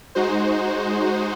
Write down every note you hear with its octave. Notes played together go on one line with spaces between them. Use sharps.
G#3 D#4 F#4 C5